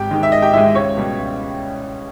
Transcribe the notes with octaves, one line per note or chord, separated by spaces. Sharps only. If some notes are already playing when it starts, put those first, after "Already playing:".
Already playing: G#1 G4 G5
G#2 D#3 G#3
E5
G#1 D#5
G4 G5
G#2 D#3 G#3 E4 E5
C#2 C#5
B2 G3
C#2